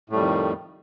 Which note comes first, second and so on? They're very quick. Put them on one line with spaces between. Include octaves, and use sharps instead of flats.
A2 A3 G3 F2 D#3